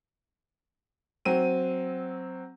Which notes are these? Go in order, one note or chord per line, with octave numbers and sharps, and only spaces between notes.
F#3 C4 D#7